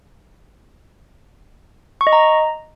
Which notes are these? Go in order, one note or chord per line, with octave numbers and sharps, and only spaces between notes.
C#6
D#5
A#5